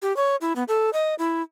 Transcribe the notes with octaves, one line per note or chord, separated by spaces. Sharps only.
G4
C#5
E4
B3
A4
D#5
E4